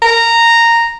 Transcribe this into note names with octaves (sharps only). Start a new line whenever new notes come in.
A#5